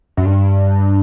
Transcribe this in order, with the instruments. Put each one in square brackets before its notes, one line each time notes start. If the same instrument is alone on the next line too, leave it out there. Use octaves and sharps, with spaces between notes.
[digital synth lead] F#2
G2